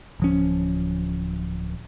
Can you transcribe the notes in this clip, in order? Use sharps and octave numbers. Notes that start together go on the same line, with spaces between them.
D1 F3 C#4